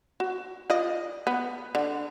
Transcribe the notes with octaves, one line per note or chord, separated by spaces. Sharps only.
F#4
F4 D5 D#5
B3
D3